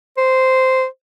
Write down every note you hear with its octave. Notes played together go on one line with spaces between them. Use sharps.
C5